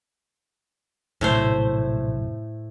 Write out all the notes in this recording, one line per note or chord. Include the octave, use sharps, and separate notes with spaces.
A#1 F#2 A2 C3 A3 C5